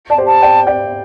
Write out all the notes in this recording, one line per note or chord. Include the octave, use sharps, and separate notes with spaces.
D5 A5
G4 C5
A5
D5 G5
D5 G5